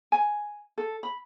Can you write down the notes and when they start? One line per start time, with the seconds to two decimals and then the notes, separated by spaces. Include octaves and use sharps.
0.12 G#5
0.78 A4
1.03 B5